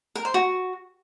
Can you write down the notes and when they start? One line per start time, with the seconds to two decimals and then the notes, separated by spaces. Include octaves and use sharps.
0.15 A#4
0.25 C5
0.34 F#4